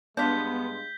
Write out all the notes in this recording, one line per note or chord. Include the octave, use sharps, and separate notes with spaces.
G2 G#3 B3 D4 F4 G6 B6 G7